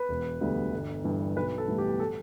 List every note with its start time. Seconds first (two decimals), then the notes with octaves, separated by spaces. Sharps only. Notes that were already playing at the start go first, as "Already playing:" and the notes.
Already playing: B4
0.09 E1
0.41 D2 D3 G3 B3
0.72 G1
1.04 G2 E3
1.36 B1 B4
1.58 A4
1.68 A2 E3 G3 B3
1.78 G4
2.00 A4